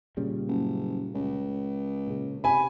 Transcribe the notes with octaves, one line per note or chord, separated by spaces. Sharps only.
A#2 C#3 G3
F#1
C#2
A#2 C#3
C3 G#5 B5